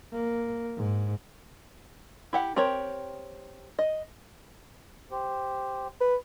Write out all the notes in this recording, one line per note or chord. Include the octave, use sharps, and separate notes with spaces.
A#3
G#2
E4 G4 F#5
C4 G4 A#4 C#5
D#5
G4 C5
B4